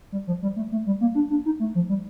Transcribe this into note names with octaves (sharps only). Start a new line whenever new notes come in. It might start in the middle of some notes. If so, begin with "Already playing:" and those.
G3
F3
G3
A3
A3
G3
A#3
D4
D4
D#4
A3
F3
G3